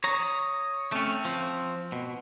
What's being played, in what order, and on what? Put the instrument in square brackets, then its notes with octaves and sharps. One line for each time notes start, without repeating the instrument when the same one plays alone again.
[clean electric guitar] C#5 A#5 [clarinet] D#6
[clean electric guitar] A3 C#4 [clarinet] C4
[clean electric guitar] F3
B2